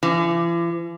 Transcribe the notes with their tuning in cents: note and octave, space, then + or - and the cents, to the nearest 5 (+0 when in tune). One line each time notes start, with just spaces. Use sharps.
E3 +45